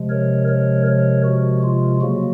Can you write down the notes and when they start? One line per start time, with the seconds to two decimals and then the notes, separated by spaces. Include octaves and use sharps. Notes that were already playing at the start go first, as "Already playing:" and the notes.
Already playing: C3 F3 G#3
0.09 A#4 C#5
0.48 A#4 C#5
0.87 A#4 C#5
1.25 F#4
1.63 F4
2.01 C#3 F#3 A#3 F#4